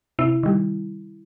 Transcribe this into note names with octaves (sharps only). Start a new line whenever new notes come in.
C3 E4
D#3 G3